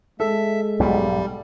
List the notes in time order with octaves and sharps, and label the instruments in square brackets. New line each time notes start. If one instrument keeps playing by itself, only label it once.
[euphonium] G#3 [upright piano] A4 [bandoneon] E5
[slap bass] B1 G#2 B2 [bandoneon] G3